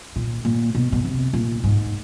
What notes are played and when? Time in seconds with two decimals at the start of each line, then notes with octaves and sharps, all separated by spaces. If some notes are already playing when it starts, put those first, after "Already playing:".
0.16 A#2
0.45 A#2
0.75 B2
0.92 B2
1.05 C3
1.33 A#2
1.64 G#2